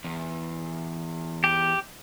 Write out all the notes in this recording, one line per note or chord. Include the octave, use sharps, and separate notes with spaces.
E2
G4